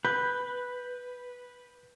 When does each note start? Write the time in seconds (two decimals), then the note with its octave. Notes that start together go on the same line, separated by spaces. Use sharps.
0.05 B4 G6